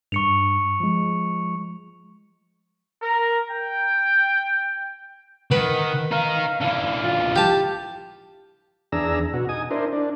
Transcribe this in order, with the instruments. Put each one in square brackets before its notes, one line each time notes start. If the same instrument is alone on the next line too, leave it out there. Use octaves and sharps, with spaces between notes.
[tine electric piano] G2 [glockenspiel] C#6 C#7 F7
[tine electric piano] F3 G#3
[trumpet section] A#4
G5
[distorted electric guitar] D#3 [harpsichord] B4 [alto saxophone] F#5
[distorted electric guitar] D#4 A#4 [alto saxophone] F5
[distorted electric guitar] D3 E3 [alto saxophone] F5
[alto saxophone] F4
[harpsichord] G4 A5
[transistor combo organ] E2 D4 G#4 A#5 E6
B2 F#4
D#4 G#5 D#6
D4 E4 A#4 C5
D4